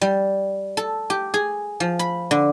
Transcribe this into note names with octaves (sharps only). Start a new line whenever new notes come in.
G3
A4
G4
G#4
F3
B5
D3